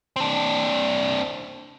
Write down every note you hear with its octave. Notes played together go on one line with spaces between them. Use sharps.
C4 D4